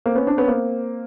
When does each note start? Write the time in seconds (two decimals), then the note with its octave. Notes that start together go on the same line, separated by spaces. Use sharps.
0.06 A#3 C4
0.15 B3 C#4
0.27 C4 D4
0.37 B3 C#4
0.48 A#3 C4